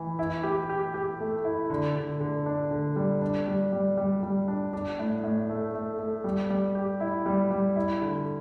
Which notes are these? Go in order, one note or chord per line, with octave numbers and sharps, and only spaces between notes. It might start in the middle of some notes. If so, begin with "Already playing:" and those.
Already playing: E3
E4
G4
G4
G4
A3
E4
D3
D3
D3
D4
D3
G3
D4
G3
G3
G3
G3
D4
D4
A2
A2
A3
A3
A3
G3
G3
G4
E4
G3
G3
E4
D3